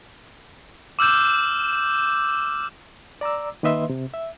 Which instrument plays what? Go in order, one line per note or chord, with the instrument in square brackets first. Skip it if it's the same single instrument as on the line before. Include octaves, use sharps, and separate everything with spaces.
[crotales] D6 E6 F6 G6 E7
[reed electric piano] D5 A#5 D6 E6
D#3 A#3 B4 D#5 E5 C6
C3
E5